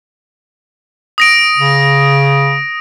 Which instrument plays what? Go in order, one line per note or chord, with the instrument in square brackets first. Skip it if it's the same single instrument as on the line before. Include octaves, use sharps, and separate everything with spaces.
[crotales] D#6 A#6 D7
[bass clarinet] C#3